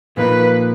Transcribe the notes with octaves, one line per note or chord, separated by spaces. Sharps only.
A#2 F3 A#3 D#4 B4